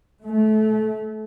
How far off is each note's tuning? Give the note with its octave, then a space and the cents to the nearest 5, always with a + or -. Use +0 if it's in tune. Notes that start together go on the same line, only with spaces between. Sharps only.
A3 -25